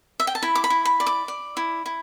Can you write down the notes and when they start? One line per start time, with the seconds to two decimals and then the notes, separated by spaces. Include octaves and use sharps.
0.20 E5
0.27 G5
0.35 A5
0.42 E4 B5
0.55 D6
0.64 B5
0.70 E4
0.85 B5
1.00 D5
1.07 D6
1.28 D5
1.57 E4
1.86 E4